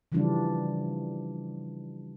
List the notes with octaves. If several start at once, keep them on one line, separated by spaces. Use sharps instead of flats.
C#3 E3 F3 G3 D4 F4